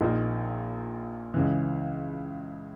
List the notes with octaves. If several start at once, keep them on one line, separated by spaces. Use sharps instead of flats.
A#1 A#2 A#3 D#4
C#2 C#3 E3